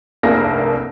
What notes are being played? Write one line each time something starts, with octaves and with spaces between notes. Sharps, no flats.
F1 C2 G2 A#3 G#4 A#6